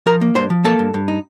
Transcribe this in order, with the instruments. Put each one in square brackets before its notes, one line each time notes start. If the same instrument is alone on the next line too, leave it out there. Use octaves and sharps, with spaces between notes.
[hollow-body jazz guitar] F3 A#4 A#5
A#3
G2 C5 C6
F3
A#3 A4 A5
G2
G2
D#4